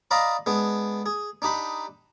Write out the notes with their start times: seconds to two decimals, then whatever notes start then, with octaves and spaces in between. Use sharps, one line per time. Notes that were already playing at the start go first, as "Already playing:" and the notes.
0.11 D5 D#5 F5 A#5 B5
0.46 G#3 B3 D4
1.06 G#4
1.42 D4 D#4 G4 B5